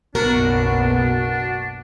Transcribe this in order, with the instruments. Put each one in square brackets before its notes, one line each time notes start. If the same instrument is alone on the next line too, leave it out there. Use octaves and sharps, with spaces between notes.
[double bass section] F#1 B1 B3 [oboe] D4 [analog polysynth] F#4 [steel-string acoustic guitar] A#4